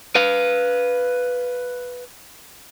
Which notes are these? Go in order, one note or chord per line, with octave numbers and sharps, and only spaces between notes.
B4 F5